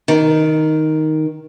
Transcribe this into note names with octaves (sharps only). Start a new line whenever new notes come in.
D#3